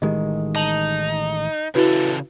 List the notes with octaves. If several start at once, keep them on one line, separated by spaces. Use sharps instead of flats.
A1 D#3 G#3 G4 D#5
D#4 A5 F#7
C#3 E3 E4 F#4 A4 B4